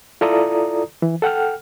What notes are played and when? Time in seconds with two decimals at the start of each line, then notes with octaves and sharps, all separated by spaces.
0.21 E4 F4 A4 D5 A#5 D#6
1.02 E3
1.22 A4 F#5 G5 F6